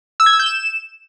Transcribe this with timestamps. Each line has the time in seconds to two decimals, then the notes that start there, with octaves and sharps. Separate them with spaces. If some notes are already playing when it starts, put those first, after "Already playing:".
0.20 E6
0.26 G#6
0.33 E6
0.39 G6
0.46 E7